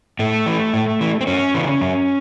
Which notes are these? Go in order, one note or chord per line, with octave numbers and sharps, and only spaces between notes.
A2 A3
E3
A2
E3
C4
F#2 C#4
C#3 E3
F#2